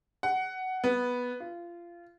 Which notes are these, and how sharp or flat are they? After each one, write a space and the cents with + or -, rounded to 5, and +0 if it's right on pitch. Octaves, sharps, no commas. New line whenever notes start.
F#5 +15
B3 -5
F4 -20